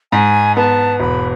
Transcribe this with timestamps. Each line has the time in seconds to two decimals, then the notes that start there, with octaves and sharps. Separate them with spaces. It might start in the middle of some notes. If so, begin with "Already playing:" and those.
0.12 G#2 G#5
0.56 B3 A5
0.99 E1 B5